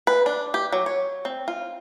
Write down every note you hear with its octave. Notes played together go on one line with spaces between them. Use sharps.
B4
D4
G4
F#3
C#5
C4
F4